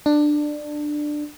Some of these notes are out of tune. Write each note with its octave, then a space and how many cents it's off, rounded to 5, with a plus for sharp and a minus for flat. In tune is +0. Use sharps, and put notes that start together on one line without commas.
D4 +15